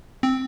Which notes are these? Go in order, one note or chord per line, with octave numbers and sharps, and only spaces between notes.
C4